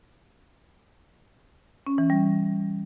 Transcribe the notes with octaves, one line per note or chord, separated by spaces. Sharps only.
C#4
E3
G3